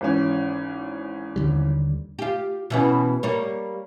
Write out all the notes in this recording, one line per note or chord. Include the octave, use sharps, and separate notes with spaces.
G#1 E3 C#4
D#2 D3 G3
F4 G4
B2 E3 C#4
G3 A#3 C#5